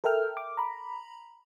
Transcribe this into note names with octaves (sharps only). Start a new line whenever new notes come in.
A4 A#4 E5 G5 F6
D6
A#5 B5